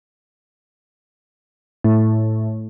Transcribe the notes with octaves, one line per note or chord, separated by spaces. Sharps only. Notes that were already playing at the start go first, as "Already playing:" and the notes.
A2